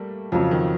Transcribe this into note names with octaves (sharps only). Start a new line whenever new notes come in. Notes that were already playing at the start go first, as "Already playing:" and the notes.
Already playing: G3 A3 A#3
F2 C#3 F3 F#3
D#3